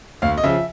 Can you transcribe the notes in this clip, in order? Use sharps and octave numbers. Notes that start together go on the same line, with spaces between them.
D2 F5
D#5
C#3 F3 E5